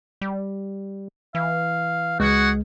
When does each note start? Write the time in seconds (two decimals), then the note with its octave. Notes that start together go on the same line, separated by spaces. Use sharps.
0.21 G3
1.35 E3 F5
2.20 C#2 G#3 F#4 G#4 F#5